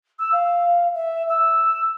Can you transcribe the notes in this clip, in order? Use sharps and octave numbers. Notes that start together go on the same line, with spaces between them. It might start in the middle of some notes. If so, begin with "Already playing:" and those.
E6
F5
E5
E6